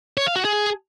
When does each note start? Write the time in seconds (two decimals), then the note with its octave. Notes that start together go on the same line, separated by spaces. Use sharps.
0.17 C#5
0.27 F5
0.36 F#4
0.45 G#4